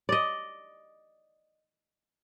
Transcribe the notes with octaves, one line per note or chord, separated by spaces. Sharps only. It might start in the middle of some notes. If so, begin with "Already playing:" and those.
D5 D#5